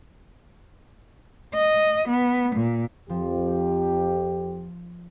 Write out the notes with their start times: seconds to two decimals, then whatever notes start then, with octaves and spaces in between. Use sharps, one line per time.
1.54 D#5
2.09 B3
2.56 A#2
3.09 F2 F3 G4